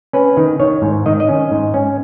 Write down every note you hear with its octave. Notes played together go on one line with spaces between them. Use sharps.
C#4 B4
D#3
D#3 C#5
G#2
D#3 D#5
D#5
C#4
G#2
C#4